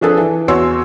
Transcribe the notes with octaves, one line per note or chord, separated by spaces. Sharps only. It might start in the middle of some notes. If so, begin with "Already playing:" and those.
F3 D4 G#4 A4 B4
E3
E2 F#4 C#5 C6 E6